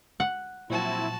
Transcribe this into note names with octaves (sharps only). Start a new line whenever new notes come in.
F#5
A#2 F3 F#3 C4 E4 F#4 A5